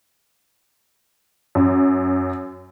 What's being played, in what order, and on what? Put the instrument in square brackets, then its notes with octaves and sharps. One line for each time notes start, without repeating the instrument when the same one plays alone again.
[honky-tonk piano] F#2